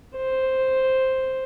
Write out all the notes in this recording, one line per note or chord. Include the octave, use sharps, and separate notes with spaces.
C5